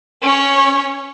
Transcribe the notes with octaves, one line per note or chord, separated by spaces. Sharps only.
C#4 C#5